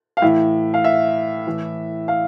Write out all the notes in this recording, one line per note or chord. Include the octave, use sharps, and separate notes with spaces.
F5
A2 E3 E5
F5
E5
A2 E3
F5